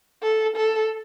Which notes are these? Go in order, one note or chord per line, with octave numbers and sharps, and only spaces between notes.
A4
A4